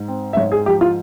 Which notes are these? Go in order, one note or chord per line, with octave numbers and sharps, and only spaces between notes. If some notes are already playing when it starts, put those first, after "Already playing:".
Already playing: G#2
C4
E5
G#2 C#5
G#4
F3 G4
F4